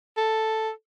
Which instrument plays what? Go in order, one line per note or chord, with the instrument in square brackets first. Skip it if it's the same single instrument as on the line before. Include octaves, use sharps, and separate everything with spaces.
[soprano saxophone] A4